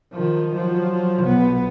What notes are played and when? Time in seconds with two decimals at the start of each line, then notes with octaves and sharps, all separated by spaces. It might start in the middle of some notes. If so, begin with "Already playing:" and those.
0.13 D#3 F3
0.55 F3 F#3
1.23 B1 B3